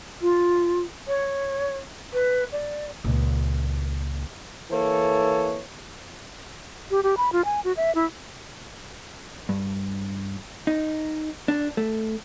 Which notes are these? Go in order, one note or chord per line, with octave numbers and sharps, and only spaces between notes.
F4
C#5
B4
D5
C#2 A#2
E3 A#3 A4 C#5
G4
G4
B5
F4
G#5
F#4
E5
E4
G2
D#4
D4
A3